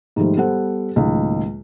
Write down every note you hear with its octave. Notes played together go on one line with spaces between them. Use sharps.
G#2 D#3 F3 G3 A3
G3 B3 A4 C5 F#5
C#2 A2 D#3 F#3 G#3 A#3